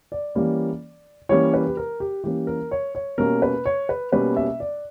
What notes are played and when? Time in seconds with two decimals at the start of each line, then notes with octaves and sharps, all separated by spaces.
0.12 D5
0.35 E3 G3 A#3 C#4
1.29 E3 G3 A#3 C#4 C#5
1.54 B4
1.67 G4
1.77 A#4
2.00 G4
2.24 E3 G3 A#3 C#4 G4
2.47 A#4
2.71 C#5
2.95 C#5
3.18 B2 G3 A#3 C#4 A#4
3.42 B4
3.65 C#5
3.89 B4
4.12 B2 G3 A#3 C#4 B4
4.37 E5
4.60 D5